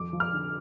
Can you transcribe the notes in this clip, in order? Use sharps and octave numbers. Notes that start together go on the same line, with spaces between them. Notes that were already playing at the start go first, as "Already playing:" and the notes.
Already playing: F2 D6
F3
F6
D3